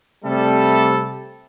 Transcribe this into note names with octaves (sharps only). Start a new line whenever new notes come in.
C3 G3 A3 A4